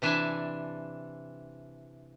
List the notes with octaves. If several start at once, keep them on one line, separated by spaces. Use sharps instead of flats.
C3 E3 D4 E5 G#5 A5